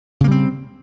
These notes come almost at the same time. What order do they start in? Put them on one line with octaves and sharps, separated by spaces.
C#3 A#3 G3 C4